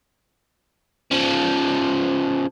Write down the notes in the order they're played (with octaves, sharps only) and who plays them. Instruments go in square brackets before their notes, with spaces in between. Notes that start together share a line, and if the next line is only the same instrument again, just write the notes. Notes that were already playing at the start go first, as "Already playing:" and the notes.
[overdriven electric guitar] C#3 F3